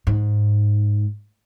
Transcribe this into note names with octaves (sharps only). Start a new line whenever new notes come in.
G#2